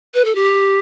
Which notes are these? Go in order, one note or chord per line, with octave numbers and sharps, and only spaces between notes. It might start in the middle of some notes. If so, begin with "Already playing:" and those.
B4
A4
G4